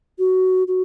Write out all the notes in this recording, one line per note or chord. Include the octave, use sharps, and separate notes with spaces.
F#4
F#4